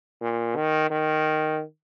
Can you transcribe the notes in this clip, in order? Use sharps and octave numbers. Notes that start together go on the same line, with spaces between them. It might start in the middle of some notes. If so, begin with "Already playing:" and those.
A#2
D#3
D#3